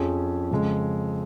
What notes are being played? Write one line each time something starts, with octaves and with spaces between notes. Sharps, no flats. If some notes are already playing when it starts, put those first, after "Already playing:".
Already playing: F2 F3 C#4 G#4
F2 C#3 G#3